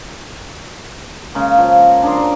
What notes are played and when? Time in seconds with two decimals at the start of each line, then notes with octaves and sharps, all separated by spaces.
1.34 C#3 G#3 A#3
1.58 F3
1.81 A#5
2.03 D4 G#4 A#4 C6
2.17 D5 G#5